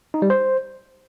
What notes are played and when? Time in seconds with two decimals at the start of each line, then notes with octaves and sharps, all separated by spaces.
0.14 D#4
0.22 G3
0.30 C5